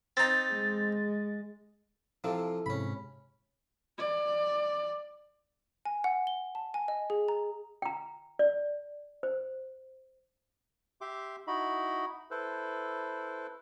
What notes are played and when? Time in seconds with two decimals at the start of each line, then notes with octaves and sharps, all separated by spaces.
0.17 C4 D#4 A6
0.52 G#3
2.24 C3 F3 E4 A4 F5
2.66 G#2 C3 C#4 B5
3.99 D5
5.85 G#5
6.04 F#5
6.27 G7
6.55 A5
6.74 G#5
6.88 D#5
7.10 G#4
7.28 A#5
7.82 G5 A#5
8.39 D5
9.23 C5
11.01 G4 E5 C6 D6
11.47 D#4 E4 F#4 D#5 B5
12.31 E4 A4 B4 C5